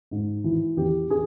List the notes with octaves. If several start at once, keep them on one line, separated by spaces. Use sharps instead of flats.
G#2
E3
E2 G4
G#4